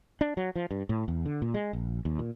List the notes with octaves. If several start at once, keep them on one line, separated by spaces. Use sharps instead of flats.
D4
F#3
F3
G2
A2
E2
D3
A#2
G#3
A#1
D#2
A#2